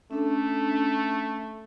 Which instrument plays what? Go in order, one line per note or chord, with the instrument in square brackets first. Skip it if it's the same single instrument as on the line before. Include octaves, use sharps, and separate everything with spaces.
[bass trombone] A3 [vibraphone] C#4 D4 A4